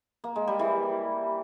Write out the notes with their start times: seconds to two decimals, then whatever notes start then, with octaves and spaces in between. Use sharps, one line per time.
0.24 A#3
0.36 G#3
0.47 G3
0.59 E3